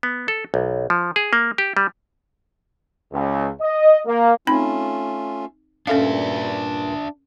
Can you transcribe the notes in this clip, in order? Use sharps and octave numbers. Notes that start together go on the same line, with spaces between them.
B3
A4
B1
F3
G#4
A#3
G4
G3
C#2
D#5
A#3
A3 C4 C#4 D#4 F4 B5
G2 A#2 C#4 D4 A4 E5 F5